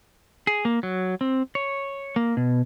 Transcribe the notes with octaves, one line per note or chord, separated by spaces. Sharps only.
G#4
A#3
F#3
C4
C#5
A#3
B2